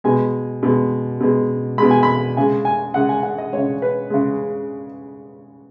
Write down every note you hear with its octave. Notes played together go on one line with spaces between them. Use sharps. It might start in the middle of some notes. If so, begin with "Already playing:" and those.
B2 G#3 G#5
B2 G#3
B2 G#3
B2 G#3 B5
G#5
B5
C#3 G#3 G#5
G#5
C#3 G#3 F#5
G#5
F#5
D#5
C#3 G#3 C#5
B4
C#3 G#3